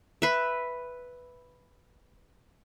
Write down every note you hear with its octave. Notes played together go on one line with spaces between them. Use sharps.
B4 E5